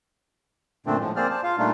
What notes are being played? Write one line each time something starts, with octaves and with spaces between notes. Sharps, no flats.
F#2 A#2 D3 A3 C4 D4
A2 F3 G#3
A#3 C4 G#4 C5 D5 F6
C5 D5 A5
F4 F5
A#2 G3 A3 D4 D#4 F4